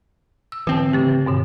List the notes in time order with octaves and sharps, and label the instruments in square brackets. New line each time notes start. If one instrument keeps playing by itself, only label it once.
[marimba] E6
[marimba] G#2 D3 [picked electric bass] E3 C4
[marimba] C#3 A3 G4
G2 B2 D3